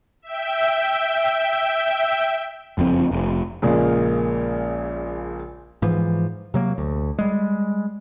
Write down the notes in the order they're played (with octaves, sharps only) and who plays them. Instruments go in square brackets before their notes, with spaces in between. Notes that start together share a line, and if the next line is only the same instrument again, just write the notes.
[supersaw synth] E5 G5
[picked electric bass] F#1 F2 F3 C4
F1
[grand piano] A#1 A#2 C#3 G#3 A#3
[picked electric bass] G#2 E3 F3
C3 F#3 A#3
D2
G3 G#3